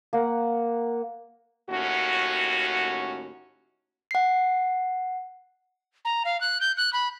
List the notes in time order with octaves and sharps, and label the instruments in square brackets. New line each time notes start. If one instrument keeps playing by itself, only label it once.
[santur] A#3 F#5
[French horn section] D#2 A2 C#4 F#4
[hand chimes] F#5 C7
[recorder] A#5
F5
F#6
G6
F#6
B5